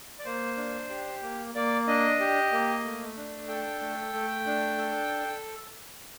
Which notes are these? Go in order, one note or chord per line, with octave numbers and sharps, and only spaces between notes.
D5
A#3 C5
D4
G4
A#3
A#3 D5
D4 D#5
G4
A#3
A3
D4
A4 G5
A3
A3
D4
A4